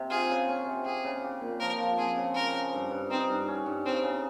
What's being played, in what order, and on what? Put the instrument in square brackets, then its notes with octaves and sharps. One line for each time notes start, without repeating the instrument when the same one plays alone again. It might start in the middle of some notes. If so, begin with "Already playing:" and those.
Already playing: [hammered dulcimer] C3
[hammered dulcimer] F4 [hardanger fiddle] G#4
[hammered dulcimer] C#3
C#4
C3
[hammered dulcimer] G4 [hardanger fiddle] G#4
[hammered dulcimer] C#3
G4
A#2
[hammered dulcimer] F3 [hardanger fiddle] A#4
[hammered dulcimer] F3
[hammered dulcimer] C4 [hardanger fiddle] G#4
[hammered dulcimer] C#3
[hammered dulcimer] C#3 [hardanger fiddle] A#4
[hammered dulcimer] C#3
G2
G2
[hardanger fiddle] C4 [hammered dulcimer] D#4
[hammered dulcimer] G2
C#4
G2
[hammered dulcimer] C#3 [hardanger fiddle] C4
[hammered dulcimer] C#3